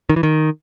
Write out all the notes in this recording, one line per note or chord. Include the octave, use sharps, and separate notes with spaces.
D#3
E3
D#3